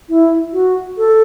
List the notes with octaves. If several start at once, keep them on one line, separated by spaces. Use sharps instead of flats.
E4
F#4
A4